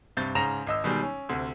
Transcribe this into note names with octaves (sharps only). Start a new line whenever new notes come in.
G2 C3 C#6 G6 A6
G#2 C#3 A#5 A#6 E7 F7
G#1 D#5 E6
B2 D#3 G3 G#3
C#4
D2 C3